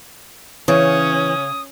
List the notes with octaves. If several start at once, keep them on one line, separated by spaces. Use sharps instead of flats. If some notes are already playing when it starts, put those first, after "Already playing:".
C#3 E3 C#4 D#6